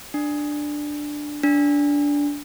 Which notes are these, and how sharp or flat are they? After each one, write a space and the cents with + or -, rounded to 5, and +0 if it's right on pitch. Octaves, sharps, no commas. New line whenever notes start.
D4 +5
D4 -20